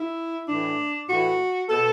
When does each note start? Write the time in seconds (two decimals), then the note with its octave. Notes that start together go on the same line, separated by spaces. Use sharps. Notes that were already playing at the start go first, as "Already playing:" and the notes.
Already playing: E4
0.48 A2 E3 D4
1.09 A2 E3 F#4
1.69 B2 A4